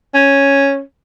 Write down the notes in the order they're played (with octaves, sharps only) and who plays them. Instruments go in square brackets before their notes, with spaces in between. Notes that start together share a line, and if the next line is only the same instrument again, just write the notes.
[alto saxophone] C#4